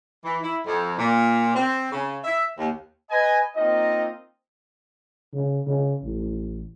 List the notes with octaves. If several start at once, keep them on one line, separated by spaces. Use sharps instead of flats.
E3
E4
F2
A#2
C4
C#3
E5
D#2
B4 D#5 G#5
A#3 C4 D#4 F4 D#5
C#3
C#3
A1